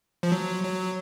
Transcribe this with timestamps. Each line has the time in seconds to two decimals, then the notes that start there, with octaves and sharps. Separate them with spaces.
0.23 F3
0.32 F#3
0.64 F#3